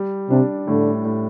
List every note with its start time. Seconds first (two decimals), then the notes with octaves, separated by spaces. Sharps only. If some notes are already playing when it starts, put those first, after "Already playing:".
Already playing: G3
0.29 C3 D4
0.67 A2 D3
1.05 A2